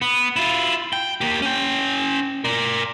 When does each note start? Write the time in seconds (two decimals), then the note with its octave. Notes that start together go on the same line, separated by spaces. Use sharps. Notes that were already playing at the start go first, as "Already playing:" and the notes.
0.02 B3
0.36 E4 F4
0.93 G5
1.21 A#3 G4
1.42 C#4 G5
2.45 A#4 D5